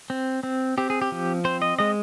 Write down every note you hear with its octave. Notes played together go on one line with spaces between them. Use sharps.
C4
C4
C4 G4
G#4
G4
F3
C4 C5
D#5
G#3 D#5